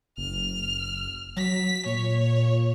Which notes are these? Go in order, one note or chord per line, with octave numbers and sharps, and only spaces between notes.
F#1 F6
F#3 B6
A#2 C#5